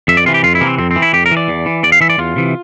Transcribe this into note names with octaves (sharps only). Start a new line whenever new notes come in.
F2 E5
D5
C3 E3 F4
G4
F2 F4
E4
C3 E3 A#3
C4
F2 C4
C4
E3
E4
F2 G4
A#4
E3
D5
E2
E3
E2 D5
F5
E3 E5
D5
E2 F4
C3 E3